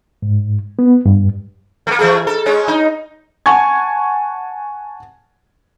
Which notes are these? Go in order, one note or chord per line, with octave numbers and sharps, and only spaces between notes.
G#2
B3
G2
A3 A#3
E3 A3 G#4
A4
G#3 C#4 C#5
D#4
F#5 G#5 A5 C#6 G#6